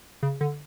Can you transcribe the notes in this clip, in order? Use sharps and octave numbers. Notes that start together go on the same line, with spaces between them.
C#3
D3